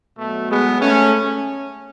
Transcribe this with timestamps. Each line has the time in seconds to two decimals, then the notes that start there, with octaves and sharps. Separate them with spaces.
0.18 B2 F#3 A3
0.49 G#3 B3
0.80 A3 C#4